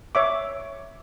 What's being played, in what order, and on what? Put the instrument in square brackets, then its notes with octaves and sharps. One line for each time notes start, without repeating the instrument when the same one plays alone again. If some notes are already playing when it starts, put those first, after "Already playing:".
[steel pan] C#5 E5 D6